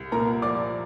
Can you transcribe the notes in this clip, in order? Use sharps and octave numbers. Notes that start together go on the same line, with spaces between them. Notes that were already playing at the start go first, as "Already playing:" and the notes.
Already playing: C2
A#2 A#4 A#5
F3 D5 D6